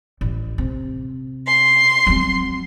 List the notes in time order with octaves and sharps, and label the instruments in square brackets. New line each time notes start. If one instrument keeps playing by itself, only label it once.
[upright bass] A1
C3
[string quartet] C6
[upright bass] F#3 C4